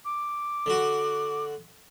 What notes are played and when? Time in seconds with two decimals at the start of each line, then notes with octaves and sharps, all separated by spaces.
0.05 D6
0.66 D3 F#4